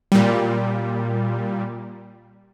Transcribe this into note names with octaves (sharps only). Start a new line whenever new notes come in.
A#2 G3